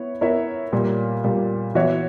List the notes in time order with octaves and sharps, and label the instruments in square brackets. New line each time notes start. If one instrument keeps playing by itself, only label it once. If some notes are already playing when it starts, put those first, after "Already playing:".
Already playing: [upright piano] B3 E4 C#5
B3 E4 A#4 C#5 E5
A#2 G3 A#3
A#2 G3 A#3
E3 B3 F#4 C#5 E5